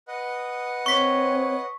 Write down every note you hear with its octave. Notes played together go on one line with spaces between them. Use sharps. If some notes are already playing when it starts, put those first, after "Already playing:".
B4 D#5 F#5
C4 C#5 C#6 B6